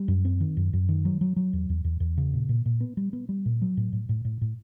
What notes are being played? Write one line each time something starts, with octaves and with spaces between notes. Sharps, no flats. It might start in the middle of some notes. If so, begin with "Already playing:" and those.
Already playing: G3
F#2
C4
D#3
F#2
F#2
D#3
F#3
F#3
F#3
E2
E2
E2
E2
C#3
A#2
A#2
A#2
B3
G3
B3
G3
A#2
F#3
A2
A2
A2
A2
A2